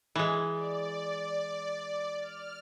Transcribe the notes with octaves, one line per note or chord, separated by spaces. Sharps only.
E3 G#3
D5
F6